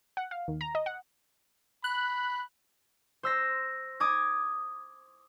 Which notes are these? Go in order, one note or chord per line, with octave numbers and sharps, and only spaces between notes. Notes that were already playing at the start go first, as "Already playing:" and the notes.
F#5
F5
D#2
A#5
D#5
F#5
B5 F#6
C5 E6 A#6
D6 D#6 G#6